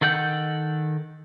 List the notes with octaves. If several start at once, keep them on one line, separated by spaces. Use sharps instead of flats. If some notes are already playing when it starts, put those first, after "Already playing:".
D#3 A4 F#5 G5 G6